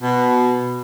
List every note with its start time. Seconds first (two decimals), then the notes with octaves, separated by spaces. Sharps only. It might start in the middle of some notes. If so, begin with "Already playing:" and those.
0.02 B2